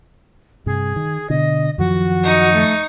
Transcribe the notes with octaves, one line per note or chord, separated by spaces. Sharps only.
G2 C3 G#4
D#3
B2 D3 D#5
F#2 D#3 F3 F#4
D#4 C#6
A3